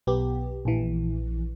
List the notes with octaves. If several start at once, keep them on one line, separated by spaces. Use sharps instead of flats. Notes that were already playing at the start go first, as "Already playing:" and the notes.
B1 B3 G4
A#1 E3